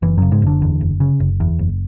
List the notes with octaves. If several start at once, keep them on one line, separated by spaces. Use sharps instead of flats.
F#1 E3
F#2 C#3 F#3
G#2 G#3
F#1 D3 D4
E2
F#1
C#3
F#1
E2
F#1